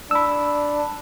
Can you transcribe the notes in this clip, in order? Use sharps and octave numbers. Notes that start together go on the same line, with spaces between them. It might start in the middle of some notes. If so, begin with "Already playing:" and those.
D4 B5 E6